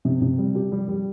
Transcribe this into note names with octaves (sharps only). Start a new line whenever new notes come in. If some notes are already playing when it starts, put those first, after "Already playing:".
C3
C3
G3
G4
G3
G3